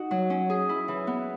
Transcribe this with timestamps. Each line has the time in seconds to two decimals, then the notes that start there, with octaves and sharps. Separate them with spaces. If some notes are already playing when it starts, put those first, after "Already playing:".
Already playing: D#4 F#4
0.11 F#3
0.30 C#4
0.50 G#4
0.69 E4
0.88 E3
1.07 B3